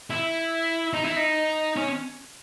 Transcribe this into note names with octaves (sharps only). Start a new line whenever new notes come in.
E4
D#4
E4
D#4
C#4